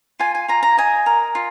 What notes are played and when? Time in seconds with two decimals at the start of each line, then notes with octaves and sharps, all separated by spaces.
0.20 F4 G#5
0.35 G#5
0.48 F4 A#5
0.63 A#5
0.77 D#5 G#5
1.06 A#4
1.35 F4